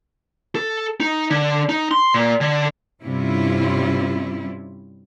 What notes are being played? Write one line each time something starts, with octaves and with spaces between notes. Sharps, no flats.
A4
D#4
D3
D#4
C6
A#2
D3
G2 C3 G3 C#4 E4 F4